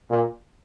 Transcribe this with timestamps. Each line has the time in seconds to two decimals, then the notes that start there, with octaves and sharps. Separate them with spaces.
0.10 A#2